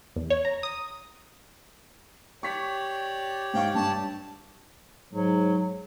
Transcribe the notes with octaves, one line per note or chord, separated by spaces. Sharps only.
E2
C#5
A#5
D#6
G4 C#5 D5 C#6 B6
G#2 F5 G5 C#6
G2 A5
G#2 F#3